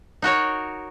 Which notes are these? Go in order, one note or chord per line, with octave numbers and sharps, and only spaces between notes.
D#4 F#4 A#4 C#5